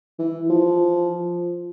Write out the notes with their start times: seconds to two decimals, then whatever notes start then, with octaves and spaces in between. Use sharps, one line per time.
0.19 E3
0.50 F3